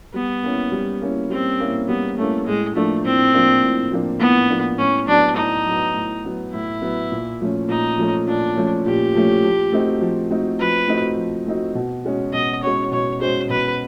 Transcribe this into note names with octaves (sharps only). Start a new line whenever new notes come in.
G3 B3
A#3 C#4 E4
G3
A#3 C#4 E4
G3 C4
A#3 C#4 E4
G3 B3
A3 A#3 C#4 E4
A2 G#3
F3 A3 A#3 D4
A2 C4
F3 A#3 D4
A2
F3 A#3 D4
A2 B3
F3 A#3 D4
A2 C#4
F#3 B3 D4
A2 D#4
F#3 B3
A2
F#3 B3
A2 E4
F#3 B3
A#2
F3 A3 C#4
A#2 D#4
F3 A3 C#4
A#2 D4
F3 A3 C#4
A#2 G4
F3 A3 C#4
F3
A3 C4 D#4 F#4
F3
A3 C4 D#4 F#4
F3 B4
A3 C4 D#4 F#4
F3
A3 C4 D#4 F#4
B2
G#3 C#4 F#4
B2 D#5
G#3 C#4 F#4 C#5
B2 C#5
G#3 C#4 F#4 C5
B2 B4